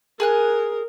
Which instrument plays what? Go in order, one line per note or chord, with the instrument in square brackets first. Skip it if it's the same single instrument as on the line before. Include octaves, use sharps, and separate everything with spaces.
[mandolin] G#4 G#5 F#6 [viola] A#4